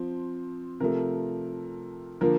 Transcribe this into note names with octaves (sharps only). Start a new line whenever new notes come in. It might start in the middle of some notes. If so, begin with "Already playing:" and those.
Already playing: F3 C4
C3 F3 A3 A#4
D3 F3 A#3 A#4